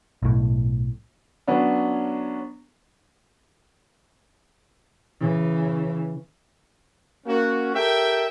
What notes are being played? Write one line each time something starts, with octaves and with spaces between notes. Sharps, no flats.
B1 A2
F#3 B3 C#4 D4
C#3 E3
A#3 C#4 F#4
G4 A4 A#4 E5 G5